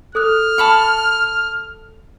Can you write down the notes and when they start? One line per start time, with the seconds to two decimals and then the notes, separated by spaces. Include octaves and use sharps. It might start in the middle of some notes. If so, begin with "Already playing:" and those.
0.15 A4 D#6 F6 F#6
0.58 A5 B5 C#6